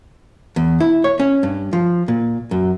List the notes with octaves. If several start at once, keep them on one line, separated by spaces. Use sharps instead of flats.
E2
E4
C#5
C#4
G2
F3
A#2
F#2